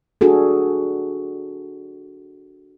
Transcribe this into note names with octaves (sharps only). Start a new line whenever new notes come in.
D4 F#4 G#4 A4